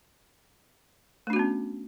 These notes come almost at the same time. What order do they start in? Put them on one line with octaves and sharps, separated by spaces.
A3 D4 F#4 B3 C#4